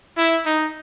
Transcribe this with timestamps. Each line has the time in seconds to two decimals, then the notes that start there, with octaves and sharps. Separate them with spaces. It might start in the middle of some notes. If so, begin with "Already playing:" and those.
0.17 E4
0.46 D#4